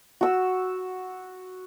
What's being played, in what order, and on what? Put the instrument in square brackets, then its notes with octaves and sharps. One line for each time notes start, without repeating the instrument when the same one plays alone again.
[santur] F#4 E6